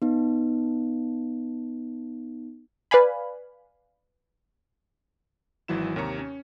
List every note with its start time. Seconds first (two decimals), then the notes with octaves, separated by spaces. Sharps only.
0.02 B3 D#4
2.91 B4 D5 F5 G#5 B5
5.68 G#1 E3 F#3 E4 E7
5.96 D#2 C3 A#4 C#5 A#5 C#7
6.19 C#4